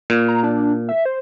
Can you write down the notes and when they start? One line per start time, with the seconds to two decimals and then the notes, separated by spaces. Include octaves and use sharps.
0.10 A#2
0.28 A#5
0.43 D4
0.89 E5
1.05 C5